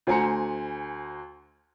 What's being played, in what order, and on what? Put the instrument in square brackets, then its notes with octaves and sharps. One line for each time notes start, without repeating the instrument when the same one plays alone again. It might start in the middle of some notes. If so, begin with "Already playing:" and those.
[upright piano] D2 C5 G#5 A#5 C#7